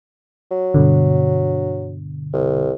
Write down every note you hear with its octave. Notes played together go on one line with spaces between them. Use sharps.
F#3
G2 B2 D3
C2